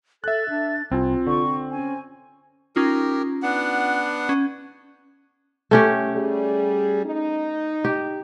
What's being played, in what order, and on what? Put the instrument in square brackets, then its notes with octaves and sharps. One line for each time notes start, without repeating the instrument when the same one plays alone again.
[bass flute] A4 [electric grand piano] E5 F#6 [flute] A6
[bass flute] D4
[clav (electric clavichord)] C2 G#5 [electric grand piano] C4 [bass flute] F4
[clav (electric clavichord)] D3 [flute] C#6
[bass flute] C#4 [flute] G#5
[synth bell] C#4 D#4 F4 [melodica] G4 A#4
[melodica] B3 D4 F#5
[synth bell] C#4
[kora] A3 C#4 G4
[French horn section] G3 G#4
D#4
[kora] G4